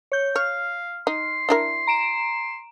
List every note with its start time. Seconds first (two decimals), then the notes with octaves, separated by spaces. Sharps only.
0.12 C#5 G6
0.36 C#5 F5 F6
1.07 D#4 C6
1.49 D4 E4 A#4
1.87 A#5 D7 E7